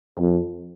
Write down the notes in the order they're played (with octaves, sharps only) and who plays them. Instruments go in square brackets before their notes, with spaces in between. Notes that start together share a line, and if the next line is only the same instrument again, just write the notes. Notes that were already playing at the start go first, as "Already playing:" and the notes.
[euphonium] F2